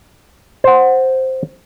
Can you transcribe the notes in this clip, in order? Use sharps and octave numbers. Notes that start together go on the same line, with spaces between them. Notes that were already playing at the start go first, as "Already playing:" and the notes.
C5 F#5